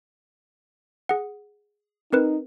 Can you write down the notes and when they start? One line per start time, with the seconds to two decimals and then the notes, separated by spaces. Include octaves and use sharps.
1.09 G#4 F#5
2.13 C4 D#4 A#4 B4